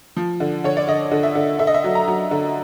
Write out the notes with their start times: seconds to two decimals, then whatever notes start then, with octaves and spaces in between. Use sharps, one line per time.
0.17 F3
0.40 D3
0.64 D3 C#5
0.77 D5
0.87 D3 D#5
1.12 D3
1.23 E5
1.35 D3
1.59 D3 E5
1.67 D#5
1.74 E5
1.84 F#3
1.95 A#5
2.08 F#3
2.31 D3